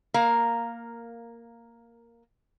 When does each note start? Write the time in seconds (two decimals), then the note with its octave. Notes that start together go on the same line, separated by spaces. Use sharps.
0.14 A#3 A#4 F5